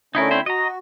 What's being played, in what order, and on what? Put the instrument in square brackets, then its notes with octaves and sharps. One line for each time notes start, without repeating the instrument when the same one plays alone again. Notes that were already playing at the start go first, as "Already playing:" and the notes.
[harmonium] D3 A3 C#4 [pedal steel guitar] D#4 E4 A#4
[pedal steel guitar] C4 E4 C5
[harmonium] F#4 [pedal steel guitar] D#5 A#5